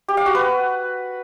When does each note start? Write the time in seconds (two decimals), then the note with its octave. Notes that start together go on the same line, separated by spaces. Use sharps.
0.08 G4
0.17 F5
0.26 F#4
0.35 B4